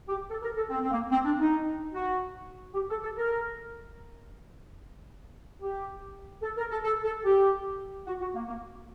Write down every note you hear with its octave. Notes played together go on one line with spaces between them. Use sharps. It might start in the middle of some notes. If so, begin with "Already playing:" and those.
G4
A4
A#4
A4
C4
C4
A#3
C4
D4
D#4
F#4
G4
A4
A4
A#4
G4
A4
A#4
A4
A4
A4
G4
F#4
F#4
A#3
A#3